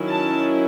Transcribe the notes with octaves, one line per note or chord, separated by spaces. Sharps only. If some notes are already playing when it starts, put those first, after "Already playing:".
Already playing: D#3 F#3 C#4 E4
A5